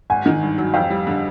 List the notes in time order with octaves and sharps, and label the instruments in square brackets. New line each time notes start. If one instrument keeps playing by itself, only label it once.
[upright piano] G#1 [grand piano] F#5 G#5
[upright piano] D#3
G2
F#3
[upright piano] F2 [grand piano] F5 G5
[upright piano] G3
D3